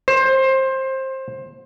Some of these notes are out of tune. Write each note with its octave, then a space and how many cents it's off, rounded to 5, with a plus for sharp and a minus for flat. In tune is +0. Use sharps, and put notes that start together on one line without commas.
C5 +20